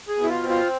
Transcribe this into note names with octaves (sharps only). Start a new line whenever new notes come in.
G#4
B2
E4
F4
C4
F4